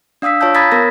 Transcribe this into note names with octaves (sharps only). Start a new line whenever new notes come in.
D4 F5 D#6 E6 B6
F4 C#5 F5 A5 E6 G6
A#5 B5 D#6 G#6 A6 B6
B3 A#4 C#5 D#6 A#6